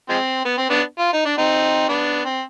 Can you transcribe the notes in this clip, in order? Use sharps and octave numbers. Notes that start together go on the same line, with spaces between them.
F3 G#3 C4
B3
C4
B3 D4
F4
D#4
D4
C4 D#4
B3 D4
C4